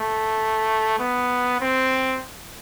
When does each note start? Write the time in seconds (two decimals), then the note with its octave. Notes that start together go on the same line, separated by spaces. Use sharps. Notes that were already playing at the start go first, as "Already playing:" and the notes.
Already playing: A3
0.99 B3
1.60 C4